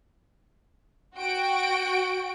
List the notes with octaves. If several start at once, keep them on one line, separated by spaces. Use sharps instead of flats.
F#4 G5 D7